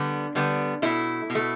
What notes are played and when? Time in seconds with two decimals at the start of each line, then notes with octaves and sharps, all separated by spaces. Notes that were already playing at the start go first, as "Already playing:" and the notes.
Already playing: D3 G3 B3
0.35 D3 G3 B3
0.82 B2 A3 E4
1.30 B2
1.35 A3